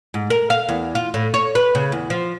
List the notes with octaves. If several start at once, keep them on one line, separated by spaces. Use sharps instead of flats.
G#2
A#4
F5
E2
F4
A2
C#5
B4
C#3
E2
F3